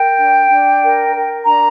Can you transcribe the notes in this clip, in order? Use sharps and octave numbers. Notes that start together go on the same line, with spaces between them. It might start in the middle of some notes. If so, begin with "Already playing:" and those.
Already playing: A#4 G5
D4
D4
A#4
A#4
D4 A#5